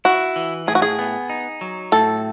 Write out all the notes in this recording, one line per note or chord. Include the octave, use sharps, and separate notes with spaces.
E4 F#4
E3
A2 G#4
F#4
G#4
B3
D#4
F#3
A2 A4